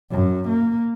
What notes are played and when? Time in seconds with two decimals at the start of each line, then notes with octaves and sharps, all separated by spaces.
0.11 F#2
0.49 A#3